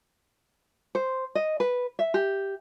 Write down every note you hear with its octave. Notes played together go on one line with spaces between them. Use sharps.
C5
D#5
B4
E5
G4